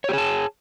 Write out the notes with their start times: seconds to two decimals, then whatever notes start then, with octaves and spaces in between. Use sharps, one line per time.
0.04 C#5
0.09 G4
0.13 G#4
0.18 A5